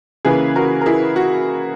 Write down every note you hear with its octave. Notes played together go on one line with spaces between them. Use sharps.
C#3 E3 A#3 G#4 B4
F#4 A#4
A#4
E4 G#4
F#4